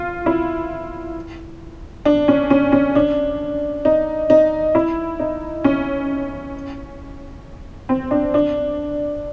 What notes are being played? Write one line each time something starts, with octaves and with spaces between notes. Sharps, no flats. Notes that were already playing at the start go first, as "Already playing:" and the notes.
Already playing: F4
E4
D4
C#4
C#4
C#4
D4
D#4
D#4
E4
D#4
C#4
C4
D4
D4